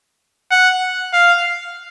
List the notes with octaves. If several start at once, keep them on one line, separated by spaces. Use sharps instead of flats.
F#5
F5